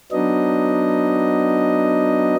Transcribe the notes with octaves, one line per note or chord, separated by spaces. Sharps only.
F#3 B3 D4 D#4 D#5